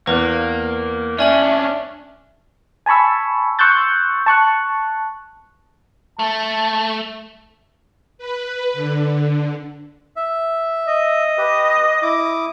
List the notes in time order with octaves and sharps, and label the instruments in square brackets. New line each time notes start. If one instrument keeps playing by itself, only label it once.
[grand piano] E2 [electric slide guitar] A#3 [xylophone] B4
[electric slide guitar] C#4 D4 [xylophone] D5 G#5 F#7 [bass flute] E5
[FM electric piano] G#5 A5 B5 C#6 E6
C6 C#6 E6 F#6 G6 A6
A5 C#6 F#6
[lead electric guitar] A3 [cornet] A5
[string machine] B4
D3
[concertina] E5
[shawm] D#5
[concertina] G4 B4
E4 D6 D#6